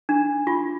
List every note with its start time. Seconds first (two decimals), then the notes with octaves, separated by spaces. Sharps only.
0.09 D4
0.47 F4